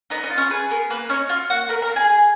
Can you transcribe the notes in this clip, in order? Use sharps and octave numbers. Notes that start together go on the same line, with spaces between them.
B3 D#4 D#5
D#4 D#5
F4
C#4 C#5
G#4 B4
B3 A#4
A#3 B4
C#4 D#4 C#5
F4 F#4 F5
A#3 F#4 F#5
B3 A#4 A#5
A#4 A#5
F4
G#4 G#5
G#4